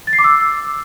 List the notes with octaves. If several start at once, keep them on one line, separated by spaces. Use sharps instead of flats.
A6
C7
D6
E6